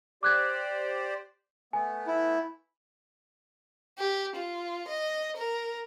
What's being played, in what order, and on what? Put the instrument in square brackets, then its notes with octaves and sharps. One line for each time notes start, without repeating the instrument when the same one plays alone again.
[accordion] G4 C5 D5 [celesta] D6 F#6 G#6
[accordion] A3 B3 [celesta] G#5
[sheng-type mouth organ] E4
[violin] G4
F4
D#5
A#4